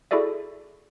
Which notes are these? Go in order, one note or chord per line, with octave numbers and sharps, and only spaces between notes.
E4 F#4 G#4 A4 D5 E5